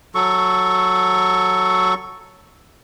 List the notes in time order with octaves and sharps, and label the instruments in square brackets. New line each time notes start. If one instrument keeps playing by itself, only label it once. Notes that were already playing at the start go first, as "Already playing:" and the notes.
[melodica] F#3 A4 C#6